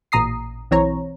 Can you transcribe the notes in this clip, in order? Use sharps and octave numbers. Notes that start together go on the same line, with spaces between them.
A1 A#2 A#5 D#6 C7
B1 E3 C4 C#5 A#5